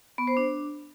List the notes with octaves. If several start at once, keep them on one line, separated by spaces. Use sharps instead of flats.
B3
C5
D4